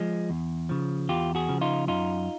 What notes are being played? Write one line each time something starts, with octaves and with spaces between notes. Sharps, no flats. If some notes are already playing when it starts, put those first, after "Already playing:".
Already playing: F3 G#3
E2
C#3 F3
E2 F4 G4
F#4 G#4
C#3 F3
D#4 F4
F#2 D#4 F4